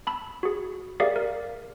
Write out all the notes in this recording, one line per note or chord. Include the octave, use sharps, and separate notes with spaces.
A5 B5 E6
F#4 G#4
G4 G#4 A#4 D5 E5 F5
A#4